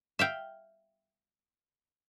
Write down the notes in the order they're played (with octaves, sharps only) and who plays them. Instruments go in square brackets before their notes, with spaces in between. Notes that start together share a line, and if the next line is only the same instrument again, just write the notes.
[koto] E5 F5 G5